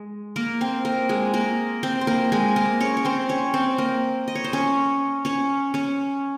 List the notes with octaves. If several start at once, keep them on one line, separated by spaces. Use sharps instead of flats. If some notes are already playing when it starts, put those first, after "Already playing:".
Already playing: G#3
A#3 A#4
C4 C5
A#3 A#4
G#3 G#4
A#3 A#4
C4 C5
C5
A#3 A#4
G#3 G#4
A#3 A#4
C#4 C#5
C#5
C4 C5
C#4 C#5
C4 C5
A#3 A#4
D#5
C#5
C5
C#4 C#5
C#4 C#5
C#4 C#5